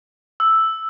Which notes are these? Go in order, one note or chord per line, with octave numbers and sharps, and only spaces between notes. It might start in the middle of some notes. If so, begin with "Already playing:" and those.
E6